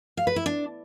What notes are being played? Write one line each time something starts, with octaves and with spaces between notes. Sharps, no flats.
F5
B4
E4
D4